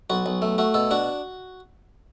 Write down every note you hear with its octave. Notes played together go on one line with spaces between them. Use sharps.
B1 F#4
B1
A3
A3 F#4
B2 A4
D4 F#4